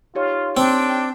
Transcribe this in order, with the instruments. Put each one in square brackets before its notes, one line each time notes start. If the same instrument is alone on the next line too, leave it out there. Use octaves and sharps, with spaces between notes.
[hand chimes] D#4 G4 C#5 [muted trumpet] F4
[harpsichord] C4 [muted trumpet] D4 [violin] G5